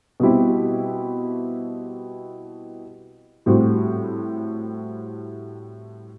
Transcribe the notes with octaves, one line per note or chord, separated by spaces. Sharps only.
B2 G3 C4 E4 G4
A2 G3 C4 F#4